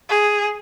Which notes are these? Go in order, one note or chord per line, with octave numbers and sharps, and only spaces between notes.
G#4